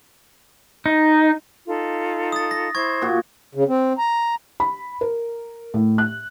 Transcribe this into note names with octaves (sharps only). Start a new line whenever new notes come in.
D#4
D#4 F4 A4
D#6 A6
A#6
E4 C5 C#6 G#6
A#2 F#4
C#3
C4
A#5
B5
A#4
A2
F#6